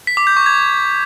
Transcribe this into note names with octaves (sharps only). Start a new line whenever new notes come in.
B6
D6
G6
C#6
G#6